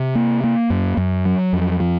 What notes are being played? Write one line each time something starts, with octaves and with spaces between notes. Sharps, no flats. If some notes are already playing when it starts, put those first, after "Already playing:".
Already playing: C3
A#3
A#3
F#2
F#2
F#3
F2
F3